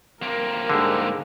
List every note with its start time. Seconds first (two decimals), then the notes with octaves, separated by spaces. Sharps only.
0.23 A#3 C4 A#4
0.69 G#2 D3 G3 G#3